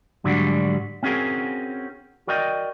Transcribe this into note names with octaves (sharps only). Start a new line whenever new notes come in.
G#2 D3 F#3 G3 D4 F#4
C4 C#4 F#4 G#4 A#4
F#4 A#4 D5 D#5 G5